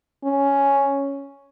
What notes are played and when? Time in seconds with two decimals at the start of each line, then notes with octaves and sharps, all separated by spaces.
0.24 C#4